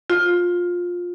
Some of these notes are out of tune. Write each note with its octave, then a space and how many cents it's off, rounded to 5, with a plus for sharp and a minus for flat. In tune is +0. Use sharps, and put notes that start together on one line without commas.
F4 +15